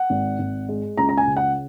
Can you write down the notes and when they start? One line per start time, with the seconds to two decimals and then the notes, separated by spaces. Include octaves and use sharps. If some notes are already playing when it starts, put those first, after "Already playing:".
Already playing: F#5
0.10 G#1
0.39 G#1
0.69 G#3
0.98 C#2 A#5
1.09 A#5
1.17 G#5
1.27 C#3
1.37 F#5